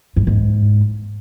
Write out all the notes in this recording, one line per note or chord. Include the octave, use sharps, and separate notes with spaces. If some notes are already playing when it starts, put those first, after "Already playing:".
G2
G#2